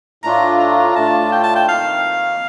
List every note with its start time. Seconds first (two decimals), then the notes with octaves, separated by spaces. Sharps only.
0.24 A2 A3 D4 F4 A#5
0.60 A#5
0.96 A2 A3 D4 F4 A5
1.32 G5
1.43 A5
1.56 G5
1.68 F2 D#3 A#3 F5